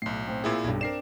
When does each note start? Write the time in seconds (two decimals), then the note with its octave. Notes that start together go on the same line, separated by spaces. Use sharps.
0.02 B1 A2 C7
0.27 A2 C4
0.44 A#2 E4 G#4
0.64 B1 G2
0.81 C4 D4 A#4 D5 C7 E7